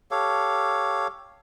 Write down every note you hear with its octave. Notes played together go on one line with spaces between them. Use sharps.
G4 A4 C#5 F5